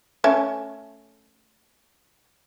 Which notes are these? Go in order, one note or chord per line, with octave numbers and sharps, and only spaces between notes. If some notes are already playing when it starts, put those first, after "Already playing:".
A3 C#4 E5